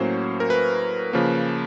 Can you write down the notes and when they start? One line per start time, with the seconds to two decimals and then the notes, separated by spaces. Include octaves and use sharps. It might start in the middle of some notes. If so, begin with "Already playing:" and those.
Already playing: A2 F#3 A#3 C#4 C5
0.40 A#4
0.50 B4
1.13 C#3 F3 A#3